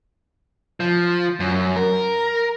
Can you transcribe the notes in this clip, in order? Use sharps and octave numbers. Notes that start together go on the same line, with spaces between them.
F3
F#2
A#4